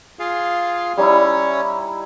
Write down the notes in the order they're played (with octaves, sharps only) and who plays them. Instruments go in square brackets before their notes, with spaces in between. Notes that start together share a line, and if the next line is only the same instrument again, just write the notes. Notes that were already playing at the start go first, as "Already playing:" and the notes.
[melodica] F4 G#4 F5
[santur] G3 D#4 E4 [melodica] C#4 C#5